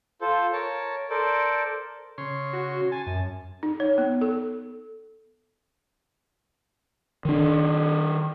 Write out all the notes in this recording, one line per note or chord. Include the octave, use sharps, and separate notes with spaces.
F4 A4 C5
A#4 C#5 A5
A4 A#4 C5 D5
C#3 C#5 C6
F#4
G#5 A5
F#2
D#4
C#5
B3
A4
D#3 D4